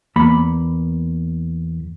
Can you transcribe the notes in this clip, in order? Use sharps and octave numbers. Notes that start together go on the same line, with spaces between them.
E2 A#3 B5